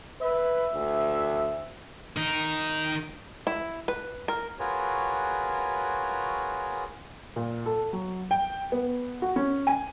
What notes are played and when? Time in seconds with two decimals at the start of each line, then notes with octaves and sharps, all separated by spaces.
0.21 B4 E5
0.73 D2
2.17 D#3 D#4
3.47 E4
3.88 B4
4.28 A#4
4.58 F4 F#4 G#4 A#4 B4 C#5
7.36 A#2
7.66 A4
7.93 F#3
8.31 G5
8.72 B3
9.22 F#4
9.36 C#4
9.67 G#5